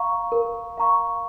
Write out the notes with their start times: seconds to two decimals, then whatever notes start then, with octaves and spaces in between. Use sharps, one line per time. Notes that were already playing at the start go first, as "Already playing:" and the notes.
Already playing: F5 A#5 C#6
0.32 A#4
0.78 F5 A#5 C#6